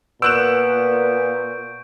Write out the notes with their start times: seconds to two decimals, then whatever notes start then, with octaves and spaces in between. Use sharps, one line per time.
0.22 A#2 B3 C#6 E6 F#6 G6 D7 E7